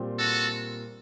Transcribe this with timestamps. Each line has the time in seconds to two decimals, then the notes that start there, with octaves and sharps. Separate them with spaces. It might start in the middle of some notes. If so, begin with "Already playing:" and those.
Already playing: A#2 G3 C4
0.19 F#4 A4